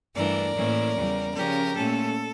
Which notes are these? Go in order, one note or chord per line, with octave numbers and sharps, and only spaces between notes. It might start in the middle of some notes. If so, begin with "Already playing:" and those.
G2 E3 A3 D4 A#4 D5
A2 E3 A#3 C#4
E2 C#3 G3
C#3 F3 C#4 G4 A#4
A#2 A3 C#4 A4